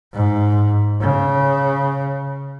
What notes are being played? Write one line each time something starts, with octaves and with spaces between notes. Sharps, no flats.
G#2
C#3